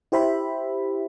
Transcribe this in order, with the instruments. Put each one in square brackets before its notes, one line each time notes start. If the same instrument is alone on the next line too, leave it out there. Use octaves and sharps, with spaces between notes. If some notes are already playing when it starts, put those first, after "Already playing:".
[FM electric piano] E4 G4 C5 E5 B5